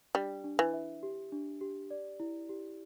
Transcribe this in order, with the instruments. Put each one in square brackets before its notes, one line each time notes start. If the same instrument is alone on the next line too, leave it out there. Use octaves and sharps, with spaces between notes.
[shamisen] G3 [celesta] D4
[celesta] D4
[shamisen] E3
[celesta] E5
G4
D4
G4
D5
E4
G4